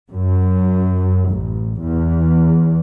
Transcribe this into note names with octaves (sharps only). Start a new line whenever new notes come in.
F#2
A1
E2